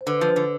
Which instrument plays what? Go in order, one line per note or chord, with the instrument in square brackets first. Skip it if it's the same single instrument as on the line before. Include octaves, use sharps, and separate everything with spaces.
[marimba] C5
[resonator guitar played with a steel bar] D3 [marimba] B4
[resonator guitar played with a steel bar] F3 [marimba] B4
[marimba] C5
[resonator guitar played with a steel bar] D3